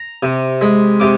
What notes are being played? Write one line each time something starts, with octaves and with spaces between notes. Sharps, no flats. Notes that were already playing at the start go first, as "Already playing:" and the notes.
Already playing: A#5
C3
G#3 B5
C3 D6